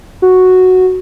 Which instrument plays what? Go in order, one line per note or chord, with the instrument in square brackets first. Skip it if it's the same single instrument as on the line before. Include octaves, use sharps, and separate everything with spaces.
[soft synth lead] F#4